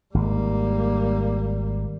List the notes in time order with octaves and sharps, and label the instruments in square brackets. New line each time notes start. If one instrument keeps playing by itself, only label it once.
[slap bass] G#1 [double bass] G3 A#3